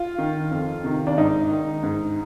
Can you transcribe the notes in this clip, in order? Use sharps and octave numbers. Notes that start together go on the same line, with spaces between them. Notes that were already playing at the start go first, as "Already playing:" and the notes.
Already playing: F4
D#3
F2
C3 D#3
D4
G#2 D#4
D#3
G#2